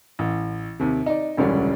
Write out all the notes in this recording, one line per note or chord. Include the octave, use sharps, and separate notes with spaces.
A1
D#2 C3
D#4 D5
E1 C#2 D3 G3 C#4 D4